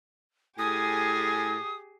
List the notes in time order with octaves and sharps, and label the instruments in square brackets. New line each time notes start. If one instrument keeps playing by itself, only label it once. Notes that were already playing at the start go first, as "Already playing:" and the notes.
[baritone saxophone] A2 [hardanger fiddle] G4 G#4 [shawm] G#5 [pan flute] D#6